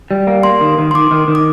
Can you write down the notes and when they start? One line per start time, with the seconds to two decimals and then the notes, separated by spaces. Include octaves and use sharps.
0.11 G3
0.27 A#3
0.43 A#3 C6
0.61 D#3
0.78 D#3
0.91 C6
0.94 D#3 D6
1.11 D#3
1.28 D#3
1.35 D6